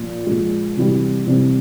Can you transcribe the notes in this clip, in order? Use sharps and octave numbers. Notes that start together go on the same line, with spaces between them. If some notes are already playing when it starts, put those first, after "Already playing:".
Already playing: A#2 F3
A#2 F3 G#3
C3 E3 G3
C3 E3 G3